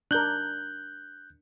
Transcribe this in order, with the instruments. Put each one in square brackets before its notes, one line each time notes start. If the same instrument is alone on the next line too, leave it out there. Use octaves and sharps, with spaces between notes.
[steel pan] D4 A#4 [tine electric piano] F#6 G6